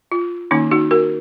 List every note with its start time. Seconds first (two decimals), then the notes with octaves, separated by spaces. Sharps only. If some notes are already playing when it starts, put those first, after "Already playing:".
0.12 F4
0.51 D#3 A#3 C#4 D#4
0.71 D#4 F#4
0.91 F#4 A#4